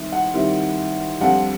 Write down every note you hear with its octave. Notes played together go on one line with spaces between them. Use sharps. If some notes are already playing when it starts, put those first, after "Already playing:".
Already playing: D#3 G3 C4 E4
F#5
D#3 G3 C4 E4
F2 D3 G3 C4 F4 F#5